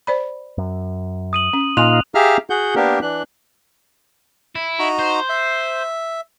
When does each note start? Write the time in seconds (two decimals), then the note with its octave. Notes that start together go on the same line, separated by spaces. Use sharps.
0.07 C5 D5 B5
0.58 F#2
1.33 D#6 D#7 F#7
1.53 C#4
1.77 A#2 D#4 F4 G#5 C6 F#6 F7
2.15 G4 G#4 E5 F5 A#5 F6
2.50 F#4 G#4 F#5 G6
2.75 A#3 B3 D4 G4 A#4
3.02 E3 D4 F#6
4.55 E4
4.79 D#4 F#4 A#5
4.99 C5
5.29 E5